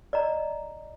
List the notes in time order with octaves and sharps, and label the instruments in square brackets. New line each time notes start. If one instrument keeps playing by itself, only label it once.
[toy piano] D5 D#5 A#5